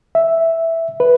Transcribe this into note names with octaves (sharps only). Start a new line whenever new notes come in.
E5
B4